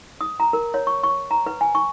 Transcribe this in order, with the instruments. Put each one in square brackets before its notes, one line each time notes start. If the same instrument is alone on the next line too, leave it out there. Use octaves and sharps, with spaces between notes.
[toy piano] D#6
A#5
A#4
C#5
C#6
C#6
A#5
B4
G#5
C#6